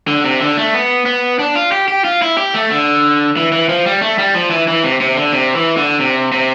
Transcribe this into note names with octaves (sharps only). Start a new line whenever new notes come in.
D3
C3
D3
A3
B3
B3
D4
F4
G4
G4
F4
E4
G4
A3
D3
E3
E3
F3
G3
A3
G3
F3
E3
E3
C3
C3
D3
C3
E3
D3
C3
C3